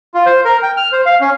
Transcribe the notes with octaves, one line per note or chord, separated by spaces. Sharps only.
F4
C5
A#4
G5
F6
C5
F5
C#4